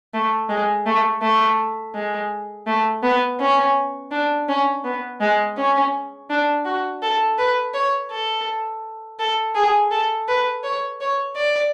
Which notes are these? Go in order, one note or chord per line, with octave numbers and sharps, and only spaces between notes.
A3
G#3
A3
A3
G#3
A3
B3
C#4
D4
C#4
B3
G#3
C#4
D4
F#4
A4
B4
C#5
A4
A4
G#4
A4
B4
C#5
C#5
D5